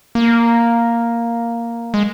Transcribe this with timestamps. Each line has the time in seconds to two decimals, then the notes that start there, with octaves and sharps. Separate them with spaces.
0.15 A#3
1.94 G#3